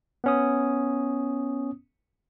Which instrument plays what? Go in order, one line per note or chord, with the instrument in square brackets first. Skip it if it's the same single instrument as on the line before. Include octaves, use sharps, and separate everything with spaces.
[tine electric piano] B3 C#4 D#6